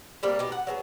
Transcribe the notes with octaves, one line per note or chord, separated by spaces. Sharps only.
C3 G3 A#3
B2 D#4 G4
F#5
F#3 B3 G#4